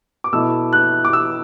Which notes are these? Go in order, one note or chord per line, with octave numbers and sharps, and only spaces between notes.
D6
B2 A3 E4 E6
F#6
D6
E6